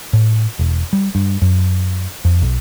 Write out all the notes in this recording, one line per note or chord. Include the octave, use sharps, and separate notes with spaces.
A2
E1
G3
G2
F#2
F2
B1